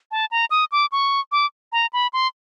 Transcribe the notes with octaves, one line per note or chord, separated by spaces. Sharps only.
A5
A#5
D#6
D6
C#6
D6
A#5
B5
C6